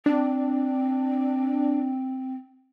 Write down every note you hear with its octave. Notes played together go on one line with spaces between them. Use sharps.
C4 D4